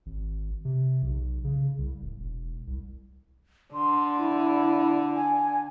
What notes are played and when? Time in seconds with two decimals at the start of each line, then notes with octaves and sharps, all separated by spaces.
0.06 G#1
0.65 C3
1.02 B1
1.44 C#3
1.78 C2
2.02 D1
2.20 E1
2.67 C2
3.74 D3 C6
4.18 E4
5.16 G#5